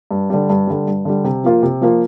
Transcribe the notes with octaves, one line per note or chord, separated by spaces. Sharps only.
G2
D3 G3
G2
D3 G3
G2
D3 G3
C3
F3 A#3 F4
C3
F3 A#3 F4